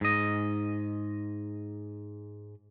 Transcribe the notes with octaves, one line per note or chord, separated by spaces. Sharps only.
G#2 D#5